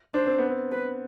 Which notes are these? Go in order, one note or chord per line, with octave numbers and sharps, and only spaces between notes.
D4 C5
C4
B3
C4
B4